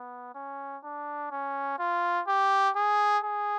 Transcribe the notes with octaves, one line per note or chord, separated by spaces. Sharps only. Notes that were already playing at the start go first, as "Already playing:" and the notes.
Already playing: B3
C#4
D4
C#4
F4
G4
G#4
G#4